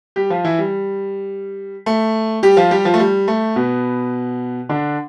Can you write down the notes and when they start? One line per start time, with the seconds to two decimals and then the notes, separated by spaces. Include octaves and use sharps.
0.16 G3 G4
0.30 F3 F4
0.45 E3 E4
0.59 G3
1.86 A3
2.43 G3 G4
2.57 F3 F4
2.71 G3 G4
2.85 F3 F4
2.94 A3
2.99 G3
3.28 A3
3.56 B2 B3
4.69 D3 D4